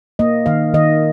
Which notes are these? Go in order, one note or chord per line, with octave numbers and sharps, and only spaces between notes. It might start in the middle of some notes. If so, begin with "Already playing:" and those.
A#3 D#5
D#3 F5
D#3 D#5